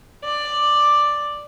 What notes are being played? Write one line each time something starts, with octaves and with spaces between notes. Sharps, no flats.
D5